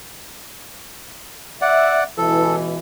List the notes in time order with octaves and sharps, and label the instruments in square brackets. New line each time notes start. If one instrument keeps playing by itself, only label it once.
[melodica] D5 F#5 [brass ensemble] E5
[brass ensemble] C#2 B2 E3 [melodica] A4